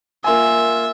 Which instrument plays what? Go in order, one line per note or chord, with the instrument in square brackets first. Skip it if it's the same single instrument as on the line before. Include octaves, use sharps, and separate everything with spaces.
[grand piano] A#3 F4 G#5 [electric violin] E5